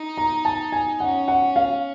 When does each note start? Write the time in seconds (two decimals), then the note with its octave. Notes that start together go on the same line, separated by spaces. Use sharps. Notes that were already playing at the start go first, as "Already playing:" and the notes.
Already playing: D#4
0.18 A#5
0.45 A5
0.72 G#5
1.00 C#4 F#5
1.28 F#5
1.56 F5